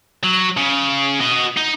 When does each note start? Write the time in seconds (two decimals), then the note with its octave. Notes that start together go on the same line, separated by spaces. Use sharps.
0.23 F#3
0.57 C#3
1.21 F#4 D#5
1.57 D#4